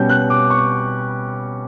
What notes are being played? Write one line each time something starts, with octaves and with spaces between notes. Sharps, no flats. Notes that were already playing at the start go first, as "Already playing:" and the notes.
Already playing: B2 G3 C#4 G6
F#6
D6
C#6